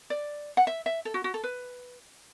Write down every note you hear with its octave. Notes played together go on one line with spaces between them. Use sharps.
D5
F#5
E5
E5
A4
F#4
F#4
A4
B4